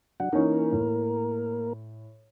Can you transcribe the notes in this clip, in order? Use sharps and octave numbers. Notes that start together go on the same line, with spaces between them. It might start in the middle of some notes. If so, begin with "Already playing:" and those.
F#3 D4 F#5
E3 A#3 C#4 D#4 A#4
A2